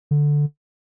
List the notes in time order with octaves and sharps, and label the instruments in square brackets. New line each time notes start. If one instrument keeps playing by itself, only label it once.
[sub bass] D3